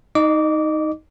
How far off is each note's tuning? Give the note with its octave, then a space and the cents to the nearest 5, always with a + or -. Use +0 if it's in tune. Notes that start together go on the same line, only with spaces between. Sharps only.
D#4 +10 D#5 -30 D6 -20